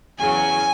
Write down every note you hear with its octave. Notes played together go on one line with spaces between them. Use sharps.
E2 C#3 F#3 G#5